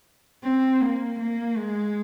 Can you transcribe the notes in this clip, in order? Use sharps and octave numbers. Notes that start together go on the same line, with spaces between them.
C4
A#3
A#3
G#3